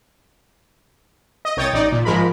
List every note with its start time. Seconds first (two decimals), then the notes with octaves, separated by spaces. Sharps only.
1.45 D#5
1.57 C2 C#5 G5 D#6 A6
1.73 A1 D#4 D5
1.92 A#2
2.05 G#2 F3 G#3 A#4 B5